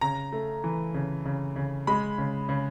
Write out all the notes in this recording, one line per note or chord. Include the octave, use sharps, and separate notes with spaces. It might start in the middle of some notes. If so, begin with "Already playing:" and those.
C#3 A#5
A3
E3
C#3
C#3
C#3
G#3 B5
C#3
C#3